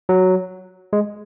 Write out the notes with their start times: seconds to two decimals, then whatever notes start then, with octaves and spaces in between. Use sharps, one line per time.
0.09 F#3
0.93 G#3